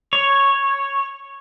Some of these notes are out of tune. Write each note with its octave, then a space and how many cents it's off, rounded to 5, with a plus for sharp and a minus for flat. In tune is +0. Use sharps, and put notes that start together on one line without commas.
C#5 -5